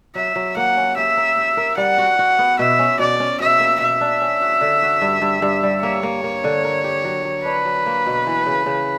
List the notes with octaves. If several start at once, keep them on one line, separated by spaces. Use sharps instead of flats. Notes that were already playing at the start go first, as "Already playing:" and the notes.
F#3 E5
F#3
A#3 F#5
C#4
G4 E5
A#4
G4
A#4
G3 F#5
F#4
F#4
B3
B2 E5
C#4
B2 D5
C#4
B2 E5
A#3
B2 E5
D4
C#4
F#4
D3
F#4
G2
G2
G2
G3
A#3 C#5
A#3
A#3
D3
A#4
G4
F#3
F#3
D4 B4
F#3
A#3
B2
E3
C#3
C#3